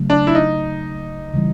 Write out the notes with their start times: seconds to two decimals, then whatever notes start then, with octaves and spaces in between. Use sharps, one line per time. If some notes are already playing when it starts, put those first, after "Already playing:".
Already playing: C#3 F#3 A3
0.10 D4
0.27 E4
0.35 D#4
1.34 C#3 E3 G3